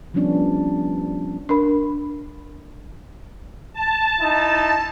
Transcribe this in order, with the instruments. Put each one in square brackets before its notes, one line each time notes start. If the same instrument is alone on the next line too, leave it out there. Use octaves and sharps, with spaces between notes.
[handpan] D#3 F3 G3 B3 C#4 D4
[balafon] D4 A#4 B5
[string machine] A5
[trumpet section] D#4 E4